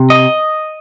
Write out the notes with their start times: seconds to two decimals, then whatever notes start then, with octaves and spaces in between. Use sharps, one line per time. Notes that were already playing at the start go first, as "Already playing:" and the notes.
Already playing: C3
0.10 D#5